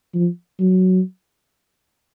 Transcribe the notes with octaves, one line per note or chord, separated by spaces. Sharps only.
F3
F#3